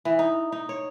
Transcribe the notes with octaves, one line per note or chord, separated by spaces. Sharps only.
E3
D#4
D#4
C#5